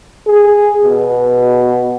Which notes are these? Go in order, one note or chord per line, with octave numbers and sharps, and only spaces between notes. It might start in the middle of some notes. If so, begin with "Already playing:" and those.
G#4
B2